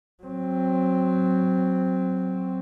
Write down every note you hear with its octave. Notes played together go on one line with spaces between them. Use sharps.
F#3 C4